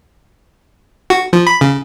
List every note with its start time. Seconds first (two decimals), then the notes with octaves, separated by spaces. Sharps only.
1.10 F#4
1.33 F3
1.47 B5
1.61 C#3